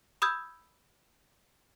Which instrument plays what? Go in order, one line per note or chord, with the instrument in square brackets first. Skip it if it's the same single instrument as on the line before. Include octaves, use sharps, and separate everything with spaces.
[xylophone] B5 D#6 E6 G6 G#6